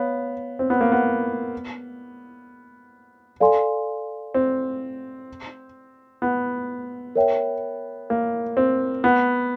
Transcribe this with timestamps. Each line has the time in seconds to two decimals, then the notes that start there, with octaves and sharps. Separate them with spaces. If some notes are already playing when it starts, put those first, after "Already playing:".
Already playing: B3 C#5 F5
0.59 C4
0.70 B3
0.81 A#3
0.92 B3
3.40 A4 D5 F5 G#5 C6
4.34 C4
6.22 B3
7.15 A#4 C#5 E5 G5
8.10 A#3
8.57 C4
9.04 B3